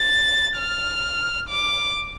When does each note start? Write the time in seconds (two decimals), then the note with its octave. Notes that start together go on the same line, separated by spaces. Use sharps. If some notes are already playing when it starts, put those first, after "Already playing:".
Already playing: A6
0.58 F6
1.49 D6